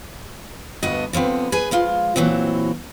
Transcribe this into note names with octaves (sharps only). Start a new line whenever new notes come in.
D2 G2 B3 F#4 D#5
D3 F3 B3 C4
G#4 B4 G#5
F3 G#3 F4
A#2 E3 F#3 C4